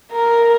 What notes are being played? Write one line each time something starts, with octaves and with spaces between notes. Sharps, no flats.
A#4